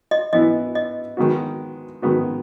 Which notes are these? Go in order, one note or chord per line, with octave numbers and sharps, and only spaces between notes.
D#5
E3 B3 E4 D#5
D#5
D#3 G#3 B3 F#4
D#3 G#3 B3 F#4